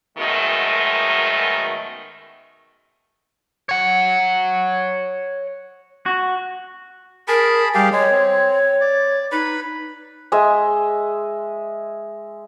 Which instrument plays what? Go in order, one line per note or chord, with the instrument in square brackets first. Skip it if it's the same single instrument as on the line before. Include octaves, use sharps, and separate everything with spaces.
[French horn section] F#2 B2 D#3 G#3 A3
[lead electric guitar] C#5 F#5
[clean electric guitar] F#4
[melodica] G#4 A5 B5 [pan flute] A#4
[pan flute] G3 [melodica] G4 G#4 F5
[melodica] G#3 [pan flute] C#5
[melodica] C4
D5
[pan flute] D#4 [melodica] B4 B5
[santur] G#3 D#5 E5 G#5